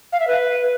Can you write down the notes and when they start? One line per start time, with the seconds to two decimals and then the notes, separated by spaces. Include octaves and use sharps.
0.12 F5
0.20 E5
0.27 B4